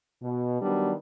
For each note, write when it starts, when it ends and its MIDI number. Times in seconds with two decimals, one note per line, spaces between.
0.23 0.59 47
0.62 0.93 51
0.62 0.93 54
0.62 0.93 55
0.62 0.93 59
0.62 0.93 62